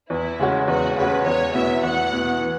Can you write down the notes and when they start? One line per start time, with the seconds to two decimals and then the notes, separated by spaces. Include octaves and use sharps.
0.10 E2 E4
0.39 C#3 G#3 C#4 F#4
0.68 E2 F#4
0.97 C#3 G#3 C#4 F#4 B4
1.25 E2 C#5
1.54 B2 B3 E4 E5
1.83 E2 F#5
2.12 B2 B3 E4
2.41 E3